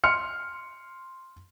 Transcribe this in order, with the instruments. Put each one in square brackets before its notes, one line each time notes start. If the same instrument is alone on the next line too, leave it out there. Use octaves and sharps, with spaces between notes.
[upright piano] C6 F6 C#7